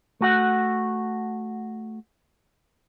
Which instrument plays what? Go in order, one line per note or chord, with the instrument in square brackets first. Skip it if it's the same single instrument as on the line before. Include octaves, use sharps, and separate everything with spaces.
[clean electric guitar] A3 F#4 F#5